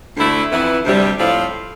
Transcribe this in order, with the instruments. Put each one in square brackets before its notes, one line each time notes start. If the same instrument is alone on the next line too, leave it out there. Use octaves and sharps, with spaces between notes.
[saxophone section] D2 D3 A3 E4
F2 E3 B3 E4
D2 C3 G3
A2 F3 C4 F4 A4